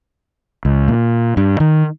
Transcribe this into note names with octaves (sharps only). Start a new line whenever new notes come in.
C#2
A#2
G2
D#3